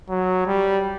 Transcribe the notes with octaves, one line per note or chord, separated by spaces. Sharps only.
F#3
G3